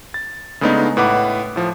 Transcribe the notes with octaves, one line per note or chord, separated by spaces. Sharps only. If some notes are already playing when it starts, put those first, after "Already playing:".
A6
C#3 G#3 A3 B3 D4 D#4
A2 B4 F#5 D6
A2 F3